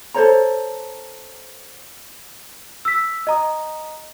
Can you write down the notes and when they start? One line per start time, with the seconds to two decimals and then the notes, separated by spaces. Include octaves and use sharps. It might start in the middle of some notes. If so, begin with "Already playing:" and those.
0.14 A4 C5 C#5 A#5
2.85 E6 B6
3.27 D#5 A#5 D#6